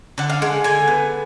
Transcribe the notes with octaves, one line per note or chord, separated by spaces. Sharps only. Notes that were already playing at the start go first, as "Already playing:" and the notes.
D3 F#5
F5
G#3 F#5
D3 G#5
B3